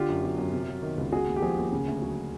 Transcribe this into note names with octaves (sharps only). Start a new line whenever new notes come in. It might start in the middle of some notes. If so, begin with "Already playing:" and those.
Already playing: D3 F4 G4
F#2
F#3
F#2
C3
F#3
D#3
C#2
C#3 F#4 G#4
D#2
G4
F3 F#4 G#4
D#2
C#3
D2
F#3